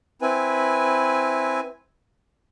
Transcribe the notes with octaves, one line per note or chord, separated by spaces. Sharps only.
C4 E4 B4 G#5